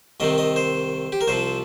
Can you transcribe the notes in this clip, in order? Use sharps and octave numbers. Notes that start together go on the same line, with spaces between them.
C2 C3 D#3 C4 D#5
D#5
C5
G4
A#4
C2 C3 F3 C5